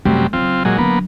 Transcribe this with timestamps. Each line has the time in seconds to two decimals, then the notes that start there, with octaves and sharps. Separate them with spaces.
0.05 F#2 C3 G3 A3
0.33 C#3 F#3 C4 F4
0.65 A#2 F#3 G#3
0.78 D3 F#3 A#3 B3